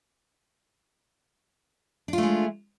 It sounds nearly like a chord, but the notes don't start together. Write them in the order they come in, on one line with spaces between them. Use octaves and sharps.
D4 F4 A3 G#3